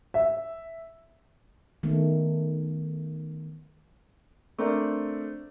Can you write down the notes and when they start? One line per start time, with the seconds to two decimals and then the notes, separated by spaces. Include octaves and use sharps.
0.14 E5
1.83 D#3 A3 B3
4.58 A3 C4 D4 A#4 D5